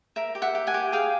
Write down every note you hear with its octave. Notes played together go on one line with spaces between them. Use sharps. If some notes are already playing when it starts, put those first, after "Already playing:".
A#4 E5
G4
E5 F#5
G4
F#5 G#5
G4
G#4 F5 G5